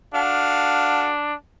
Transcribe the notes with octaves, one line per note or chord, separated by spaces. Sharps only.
D4 F#4 A4 F5